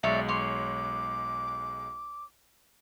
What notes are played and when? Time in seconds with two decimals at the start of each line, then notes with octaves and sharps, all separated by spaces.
0.03 B1 G#3 C#5 D5 E5
0.28 C#5 C6 D6